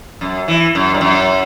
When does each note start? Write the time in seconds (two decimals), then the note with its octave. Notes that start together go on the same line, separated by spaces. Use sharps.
0.21 F#2
0.48 E3
0.75 F#2
0.94 G2
1.01 F#2